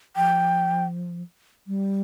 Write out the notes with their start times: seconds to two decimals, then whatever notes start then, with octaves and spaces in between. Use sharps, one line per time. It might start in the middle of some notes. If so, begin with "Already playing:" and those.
0.17 F3 G5
1.67 G3